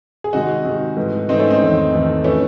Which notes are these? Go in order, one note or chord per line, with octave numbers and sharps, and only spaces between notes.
G#4
C3 D#3 G#3 D#4 F#4
C3 D#3 G#3
G#2 E3 A3
G#2 E3 A3 C4 D#4
A3 C#4
C4 D#4
E2 D#3 A3
E2 D#3 A3
E3 A3 C#4